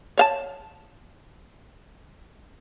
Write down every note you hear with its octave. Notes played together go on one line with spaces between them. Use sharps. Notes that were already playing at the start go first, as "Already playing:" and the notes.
C#5 F5 A5